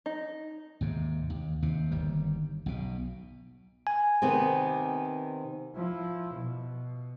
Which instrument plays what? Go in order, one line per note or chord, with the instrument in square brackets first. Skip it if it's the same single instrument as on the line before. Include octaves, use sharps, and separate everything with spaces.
[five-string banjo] D#4
[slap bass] D#2 G#2 C3
D#2
D#2 C3
G1 D#3 G3
B1 B2
[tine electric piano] G#5
[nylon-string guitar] C3 D#3 B3
[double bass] F3 E4
B2